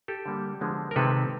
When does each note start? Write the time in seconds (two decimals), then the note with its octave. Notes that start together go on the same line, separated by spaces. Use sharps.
0.08 G4 A4
0.26 D3 G3 A#3
0.60 D3 F3 G#3 B3
0.91 A#4
0.96 C3 D#3 G#3 C4 A4 B4